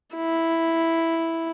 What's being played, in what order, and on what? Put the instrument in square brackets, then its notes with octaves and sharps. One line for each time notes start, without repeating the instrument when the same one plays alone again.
[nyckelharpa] E4